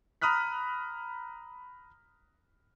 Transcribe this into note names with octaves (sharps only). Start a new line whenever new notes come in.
A#5 B5 D#6 F6 F#6 B6